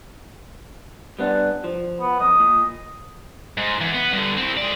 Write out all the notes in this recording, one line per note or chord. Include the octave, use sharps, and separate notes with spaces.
G3 B3 D4
F3
B3
B1 F2 D#5
A#2
G#2
E2
B3
G2 D3
C4 E4
G#3 D5